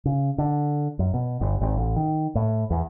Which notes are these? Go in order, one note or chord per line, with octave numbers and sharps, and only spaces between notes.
C#3
D3
F#2
B2
G1
G#1
A1
D#3
A2
E2